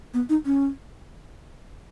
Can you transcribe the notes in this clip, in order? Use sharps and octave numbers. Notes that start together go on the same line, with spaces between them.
B3
D#4
C#4